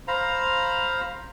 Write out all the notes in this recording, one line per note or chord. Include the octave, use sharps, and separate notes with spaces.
C5 F5 A#5 B5